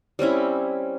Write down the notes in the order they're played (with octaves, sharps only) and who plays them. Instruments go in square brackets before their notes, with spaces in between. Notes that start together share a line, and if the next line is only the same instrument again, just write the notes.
[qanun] G3 C4 C#4 E4